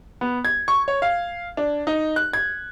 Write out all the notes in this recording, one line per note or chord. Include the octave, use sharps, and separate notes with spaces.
B3
G#6
C#6
C#5
F5
D4
D#4
F#6
G#6